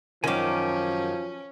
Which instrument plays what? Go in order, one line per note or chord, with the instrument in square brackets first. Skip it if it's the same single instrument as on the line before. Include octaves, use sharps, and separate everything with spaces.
[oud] F#2 D#3 [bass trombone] F3 [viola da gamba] C#4 [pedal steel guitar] G#5 D6